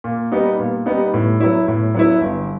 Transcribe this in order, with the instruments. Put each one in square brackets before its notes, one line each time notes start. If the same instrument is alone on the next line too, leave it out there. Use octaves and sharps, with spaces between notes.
[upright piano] A#2
G3 B3 D#4
A#2
G3 B3 D#4
A2
F#3 B3 E4
A2
F#3 B3 E4
G1